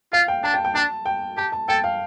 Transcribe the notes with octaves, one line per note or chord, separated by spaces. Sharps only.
F4 F5
G5
D4 A5
G5
G5
D4 A5
G5
G4 A5
A5
A4 G5
F5